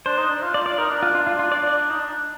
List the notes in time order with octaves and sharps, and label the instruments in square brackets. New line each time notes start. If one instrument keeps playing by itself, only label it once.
[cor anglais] D4 [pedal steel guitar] C5
[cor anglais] D#4
D4
F4
[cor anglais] F4 [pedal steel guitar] D5
[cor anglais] F4 [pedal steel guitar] D5
[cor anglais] D#4 [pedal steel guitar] A#4
[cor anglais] D4
[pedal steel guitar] F4
F4
F4
F4
D5
D5
[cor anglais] D#4
D4